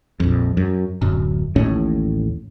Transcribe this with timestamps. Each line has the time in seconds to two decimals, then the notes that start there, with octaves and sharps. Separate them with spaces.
0.20 A#1 F2
0.57 F#2
1.02 D1 F#2
1.56 A1 D#2 A2 C#4